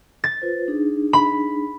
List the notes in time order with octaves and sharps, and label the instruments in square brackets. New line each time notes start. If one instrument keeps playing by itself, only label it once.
[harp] A6
[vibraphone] F4 B4 C5
D4 D#4 G#4
[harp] B5